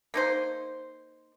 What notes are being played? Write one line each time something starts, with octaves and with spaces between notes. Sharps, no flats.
A#3 D#4 C5